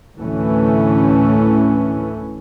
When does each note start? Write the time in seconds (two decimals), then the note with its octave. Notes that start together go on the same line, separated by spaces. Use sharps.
0.19 D2 A2 E3 A3 C#4